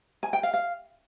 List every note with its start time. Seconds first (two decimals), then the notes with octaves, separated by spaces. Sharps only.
0.23 G#5
0.33 G5
0.43 F5
0.54 F5